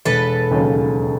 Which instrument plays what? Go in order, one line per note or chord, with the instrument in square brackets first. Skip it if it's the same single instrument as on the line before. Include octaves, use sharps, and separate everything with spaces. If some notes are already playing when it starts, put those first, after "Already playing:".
[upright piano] E1 [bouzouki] A4 B4
[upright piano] D#2 C#3 F#3